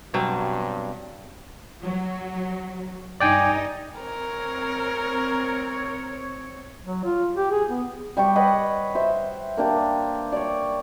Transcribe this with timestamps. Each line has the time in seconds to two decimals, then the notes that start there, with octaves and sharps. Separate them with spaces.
0.14 G2 B2 F#3 C4
1.83 F#3
3.20 G2 D#4 D5 G5 G#5
4.01 C4 A#4 C#5
6.85 F#3
7.04 F4
7.36 G4
7.51 G#4
7.70 B3
8.17 G3 G5 B5 C#6
8.36 B4 C#5 D#5 F#5
8.95 C5 E5
9.57 A#3 D4 G4
10.32 C#5 D5